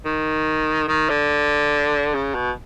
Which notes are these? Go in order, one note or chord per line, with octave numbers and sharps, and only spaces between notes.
D#3
D#3
D3
C#3
B2